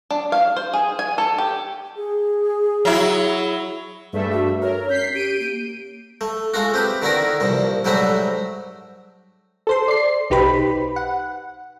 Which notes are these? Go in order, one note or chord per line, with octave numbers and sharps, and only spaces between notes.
D4
F5
C5
G#4
G#5
A4
G4
G#4
F#3 E4
G2 A3 G#4 E5
F#4
A#4 C#5
C#4 G6 B6 C7
G4 G6 D7 D#7
A#3
A3
G#3 A3 F4 F#4
C4 G4 B4
D3 D#3 B3 E4 F#4 A#4
C2 A#2 F3
G#2 F#3 G3 A3 F#4 E5
A4 C5 C6
D5 C7
B1 D#4 G4 B4 C5 B5
F#5